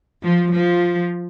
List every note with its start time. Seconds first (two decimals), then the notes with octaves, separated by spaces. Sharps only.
0.21 F3
0.54 F3